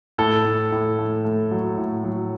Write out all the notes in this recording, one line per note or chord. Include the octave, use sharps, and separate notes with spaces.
A2 A4
A2
A2
A3
A3
F#3
A2
F#3